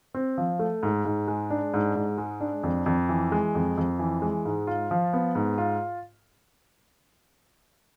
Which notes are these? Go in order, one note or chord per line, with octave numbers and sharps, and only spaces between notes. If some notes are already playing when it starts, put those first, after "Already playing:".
C4
F3
A3
G#2
G#2
G#3
D4
G#2
G#2
G#3
D4
F2
F2
E3
G#3
F2
F2
E3
G#3
G#2
F4
F3
B3
G#2
F4